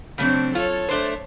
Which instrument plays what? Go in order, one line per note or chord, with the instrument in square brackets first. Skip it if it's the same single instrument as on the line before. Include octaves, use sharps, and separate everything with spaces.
[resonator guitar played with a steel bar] C#3 A3 [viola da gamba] F#3 C4 D4
[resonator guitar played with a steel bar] F4 [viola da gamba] A4 C#5
[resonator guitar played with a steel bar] A3 D4 C5